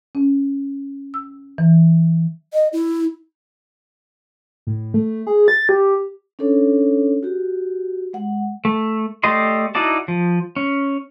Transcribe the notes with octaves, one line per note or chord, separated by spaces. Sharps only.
C#4
E6
E3
D#5
E4
A2
A3
G#4
A6
G4
C#4 D4 A4 C#5
F#4 G4
G#3 F#5
A3
A3 G4 D5 D#5 C6
D#4 E4 F#4 D5 A5
F3
C#4